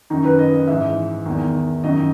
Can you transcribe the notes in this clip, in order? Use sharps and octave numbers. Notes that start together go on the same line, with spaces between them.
F#2 D#3 D#4
B4
D#5
D#5
G#2 E3 E5
E2 D#3
F#2 D#3 D#5